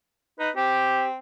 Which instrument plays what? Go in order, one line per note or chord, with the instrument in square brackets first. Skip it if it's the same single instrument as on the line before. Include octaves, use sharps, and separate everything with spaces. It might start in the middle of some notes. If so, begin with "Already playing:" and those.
[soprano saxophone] D#4 [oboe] B4
[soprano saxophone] C4 [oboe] G4